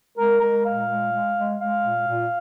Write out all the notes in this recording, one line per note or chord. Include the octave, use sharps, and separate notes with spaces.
G#3 A#4
G#3 A#4
A#2 F5
G#3
G#3
G#3
G#3 F5
A#2
A#2